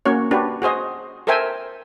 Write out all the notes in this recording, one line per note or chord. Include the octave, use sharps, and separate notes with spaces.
A#3 C#4 F#4 C#5
D4 F#4 G4 B4
F#4 G#4 C5 D#5
A4 A#4 C5 E5 G5 G#5